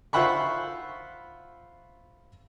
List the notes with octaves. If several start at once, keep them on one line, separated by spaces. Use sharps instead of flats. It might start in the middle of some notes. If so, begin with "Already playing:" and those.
F4 C5 E5 F#5 B5 C#6